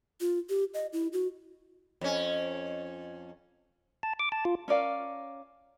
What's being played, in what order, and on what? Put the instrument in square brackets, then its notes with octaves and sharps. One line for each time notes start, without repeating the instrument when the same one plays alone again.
[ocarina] F4
G4
D#5
E4
F#4
[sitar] F2 C#4
[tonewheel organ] A5
D6
A5
F4
[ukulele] C#4 A#4 D5 F5